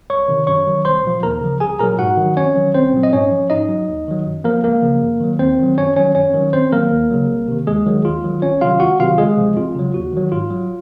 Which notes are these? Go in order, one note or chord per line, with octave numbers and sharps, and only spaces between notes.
C2 C#5 C#6
C3 D#3
F#2 C#5 C#6
D#3 F#3
C2 C5 C6
A#2 F3
D#2 A#4 A#5
C#3 F3
C2 G#4 G#5
A#2 F#3 A#4 A#5
G#2 F#4 F#5
D#3 F#3
F2 C#4 C#5
D#3 F#3
C2 C4 C5
A#2 F#3
D#5
G#2 C#4 C#5
F3
G#2 D#4 D#5
F#3
D#2
D#3 F#3
F#2
F3 A#3 A#4
C#2 A#3 A#4
C#3 F3
F#2
D#3 F#3
D#2 C4 C5
D#3 F#3
F#2 C#4 C#5
D#3 F#3 C#4 C#5
F#2 C#4 C#5
D#3 F#3
F2 C4 C5
D#3 F#3 A#3 A#4
D#2
C#3 F#3
C2
C3 D#3
D#2 G#3 G#4
D#3 F#3
D#2 F4
D#3 F#3
C2 C#4 C#5
C3 D#3 F#3 F4 F5
C#2 F#4 F#5
C3 D#3 F#3 F4 F5
C#2 G#3 G#4
C3 F3
F2 F4
C#3 F#3
D#2 F#4
D#3 F#3
G#2 F4
F#3